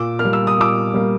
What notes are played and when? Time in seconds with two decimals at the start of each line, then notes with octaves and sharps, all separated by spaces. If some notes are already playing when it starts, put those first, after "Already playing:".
Already playing: A#2 D6 E6
0.19 A#3 F6
0.25 G3
0.33 E6
0.47 D#6
0.57 A#2 D6 E6
0.94 G3 A#3